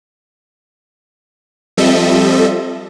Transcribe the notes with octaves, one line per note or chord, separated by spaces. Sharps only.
F3 G3 C4 A4 D#5 E5